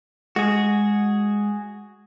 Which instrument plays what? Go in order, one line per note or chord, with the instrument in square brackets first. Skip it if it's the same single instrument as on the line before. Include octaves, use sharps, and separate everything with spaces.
[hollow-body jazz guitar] G#3 [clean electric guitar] F#4 G#4